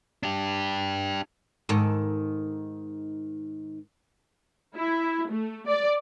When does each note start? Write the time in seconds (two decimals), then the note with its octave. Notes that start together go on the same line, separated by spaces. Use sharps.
0.23 D4 G4
1.69 G#2 D#3 A4
4.75 E4
5.30 A3
5.67 D5